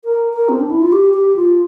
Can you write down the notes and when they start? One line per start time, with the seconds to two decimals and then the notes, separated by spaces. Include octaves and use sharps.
0.04 A#4
0.33 A#4
0.49 C4
0.60 D4
0.71 E4
0.81 F4
0.92 G4
1.14 G4
1.36 F4